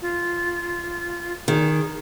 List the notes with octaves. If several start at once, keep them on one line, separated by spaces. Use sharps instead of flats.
F4
D#3 G#4